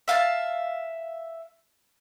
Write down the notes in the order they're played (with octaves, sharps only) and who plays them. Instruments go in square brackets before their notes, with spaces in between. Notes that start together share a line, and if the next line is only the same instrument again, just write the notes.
[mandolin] E5 F5 G5 A5